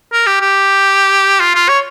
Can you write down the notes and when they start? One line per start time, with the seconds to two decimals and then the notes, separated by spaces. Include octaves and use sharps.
0.13 A#4
0.26 G4
0.41 G4
1.40 F4
1.55 F4
1.68 C#5